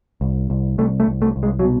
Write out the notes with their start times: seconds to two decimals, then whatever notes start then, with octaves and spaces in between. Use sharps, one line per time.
0.21 C2
0.50 C2
0.78 C2 A3
1.00 A3
1.07 C2
1.22 A3
1.36 C2
1.43 G#3
1.59 F#3
1.65 B2